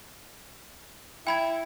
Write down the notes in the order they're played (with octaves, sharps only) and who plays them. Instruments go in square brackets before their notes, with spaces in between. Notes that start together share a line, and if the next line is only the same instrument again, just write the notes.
[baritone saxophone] E4 [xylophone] G5 B5 G#6